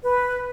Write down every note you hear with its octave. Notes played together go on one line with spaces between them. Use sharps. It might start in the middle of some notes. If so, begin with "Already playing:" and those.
B4